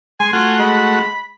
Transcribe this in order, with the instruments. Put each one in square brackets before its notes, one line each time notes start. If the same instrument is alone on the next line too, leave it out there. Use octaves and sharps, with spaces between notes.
[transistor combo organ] G#3 C6 [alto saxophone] G#5
[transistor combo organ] A3 F#4 F#5 [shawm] F4
[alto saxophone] G#3 [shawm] B5